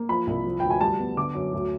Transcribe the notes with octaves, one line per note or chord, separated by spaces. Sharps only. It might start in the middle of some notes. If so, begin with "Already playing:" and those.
Already playing: A#3
F3 B5
C2
F3
D2 G5
G#5
G3 A5
B3
D3 D6
F#2
D2